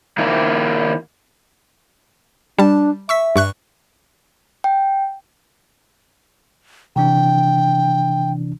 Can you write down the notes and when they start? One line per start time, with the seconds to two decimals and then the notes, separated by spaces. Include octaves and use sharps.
0.18 D#3 A#3 D4 E4 F5
2.59 G3 D4 A5
3.09 E5 C#6 E6 B6
3.36 G2 C#6 F#6
4.64 G5
6.96 C3 E3 D4 G5